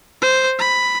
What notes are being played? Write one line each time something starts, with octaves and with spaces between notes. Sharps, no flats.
C5
B5